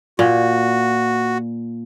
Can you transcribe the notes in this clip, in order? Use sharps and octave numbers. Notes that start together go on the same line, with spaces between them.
A#2 F#4